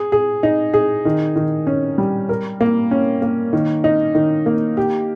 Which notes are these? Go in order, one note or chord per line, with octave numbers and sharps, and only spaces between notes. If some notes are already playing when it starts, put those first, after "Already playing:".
Already playing: G#4
G#4
D#4
G#4
D#3
D#3
C#4
G3
A#4
A#3
C#4
A#3
D#3
D#4
D#3
A#3
G4